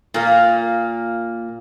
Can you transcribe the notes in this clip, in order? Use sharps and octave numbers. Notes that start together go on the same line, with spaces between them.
A#2 A#3